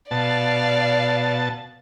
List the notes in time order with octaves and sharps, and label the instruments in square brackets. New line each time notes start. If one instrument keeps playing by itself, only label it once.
[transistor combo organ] B2 A5 [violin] D5 F5